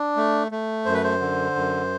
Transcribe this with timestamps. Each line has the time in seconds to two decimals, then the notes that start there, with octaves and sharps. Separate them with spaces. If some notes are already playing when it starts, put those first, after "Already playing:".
Already playing: D4
0.17 A3
0.52 A3
0.86 F#2 C5
0.94 B4
1.04 C5
1.21 D3
1.56 F#2